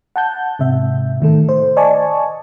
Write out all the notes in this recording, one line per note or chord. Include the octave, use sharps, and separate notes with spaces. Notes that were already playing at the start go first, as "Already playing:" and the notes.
F#5 A5 G6
G#2 C3 E5
A2 D#3 A3 A4
C5
D5 D#5 G#5 A5 C#6